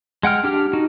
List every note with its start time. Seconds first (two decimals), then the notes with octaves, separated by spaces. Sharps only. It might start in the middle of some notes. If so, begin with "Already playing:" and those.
0.23 G#3 F#5 G5 F6
0.44 D4 G4 F6
0.73 D#4 F#4